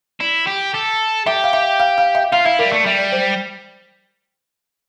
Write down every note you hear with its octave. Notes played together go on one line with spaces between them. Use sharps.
E4 D5
G4
A4
G4 E5
F5
E5
F5
F5
E5
F4 F5
E4 E5
G3 A#4
A3 D5
G3 E5
D5
C5